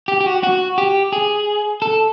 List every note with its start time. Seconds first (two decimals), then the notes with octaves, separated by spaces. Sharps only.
0.08 G4
0.21 G4
0.26 F#4
0.43 F#4
0.78 G4
1.12 G#4
1.82 A4